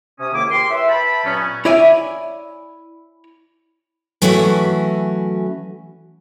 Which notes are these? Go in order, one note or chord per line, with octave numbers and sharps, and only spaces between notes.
C3 C#4 D#6
C#2 D#3 A#3 E4 D6
G4 G#4 A#4 C6
E4 B4 C#5 E5
B4 E5 G5 A5 B5
G2 A#2 F#3 B3 C#4
E4 C#5 D5 E5 G#5
E3 F#3 A3 C#4 E4 F#4